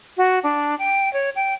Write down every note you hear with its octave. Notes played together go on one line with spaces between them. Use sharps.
F#4
D4
G5
C#5
G5